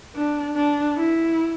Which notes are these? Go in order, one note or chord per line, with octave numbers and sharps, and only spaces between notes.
D4
D4
E4